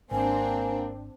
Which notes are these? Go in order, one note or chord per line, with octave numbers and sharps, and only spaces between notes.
G#1 A#3 C4 D4 G#5